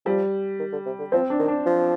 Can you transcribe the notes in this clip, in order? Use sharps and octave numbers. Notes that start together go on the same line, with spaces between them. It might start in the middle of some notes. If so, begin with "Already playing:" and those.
F3 G3
D#3
D3
C3
D3
F3 C4
D4
D#3
D4
F3